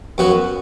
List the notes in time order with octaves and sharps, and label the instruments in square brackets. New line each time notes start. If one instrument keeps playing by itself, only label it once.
[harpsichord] F#2 F#3 B3 F#4